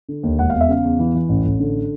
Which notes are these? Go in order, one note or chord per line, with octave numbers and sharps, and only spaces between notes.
D3
D#2
E1 F#5
E2 F5
E5
C#3 F5
E2
E3
E3
A1
A1
D3